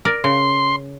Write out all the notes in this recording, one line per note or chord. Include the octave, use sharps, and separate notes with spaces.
A#4 D5
C#3 C6